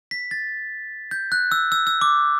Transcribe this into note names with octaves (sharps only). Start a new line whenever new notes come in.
B6
A6
G6
F#6
E6
E6
E6
D6